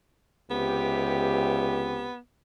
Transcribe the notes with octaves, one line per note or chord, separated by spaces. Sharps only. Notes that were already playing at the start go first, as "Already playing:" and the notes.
C#2 C3 B3 G4